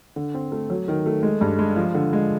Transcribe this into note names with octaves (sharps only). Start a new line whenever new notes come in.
D3
C4
A3
F#3
D#3
A3
G#3
G2
G#3
F3
D3
G#3